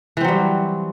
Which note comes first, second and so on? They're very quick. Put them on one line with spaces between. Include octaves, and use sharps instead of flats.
E3 C4 F#3 G3